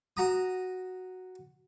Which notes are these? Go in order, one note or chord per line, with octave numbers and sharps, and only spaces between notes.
F#4 A#5 D#6